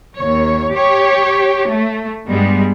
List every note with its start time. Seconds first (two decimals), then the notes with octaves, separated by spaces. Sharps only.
0.16 D#2 C#5
0.73 G4 C#5
1.68 A3
2.27 G2 G3 G#3 B3